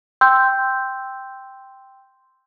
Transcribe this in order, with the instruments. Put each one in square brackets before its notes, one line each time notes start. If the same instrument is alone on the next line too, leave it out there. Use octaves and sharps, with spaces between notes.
[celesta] G5 C6 E6 G6